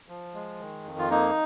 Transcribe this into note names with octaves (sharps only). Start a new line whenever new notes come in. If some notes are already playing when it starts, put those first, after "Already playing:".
F3
G#3
D#3
F2
F4
A#3 D#4